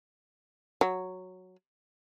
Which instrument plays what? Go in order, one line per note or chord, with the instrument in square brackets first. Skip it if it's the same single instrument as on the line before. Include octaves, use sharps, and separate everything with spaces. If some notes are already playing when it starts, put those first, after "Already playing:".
[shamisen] F#3